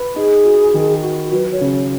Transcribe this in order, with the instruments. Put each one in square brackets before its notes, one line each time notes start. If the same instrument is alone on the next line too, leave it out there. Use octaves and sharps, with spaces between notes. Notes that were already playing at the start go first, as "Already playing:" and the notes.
Already playing: [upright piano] B4
[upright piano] D#4 [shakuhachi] G#4
[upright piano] F#4
D#3
F#4
[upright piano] F#3 [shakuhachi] B4
[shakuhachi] C#5
[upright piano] C#3